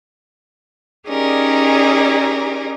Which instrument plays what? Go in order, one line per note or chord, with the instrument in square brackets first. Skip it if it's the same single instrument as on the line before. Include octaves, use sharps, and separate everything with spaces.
[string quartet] C#4 D#4 G4 G#4 A#4 D5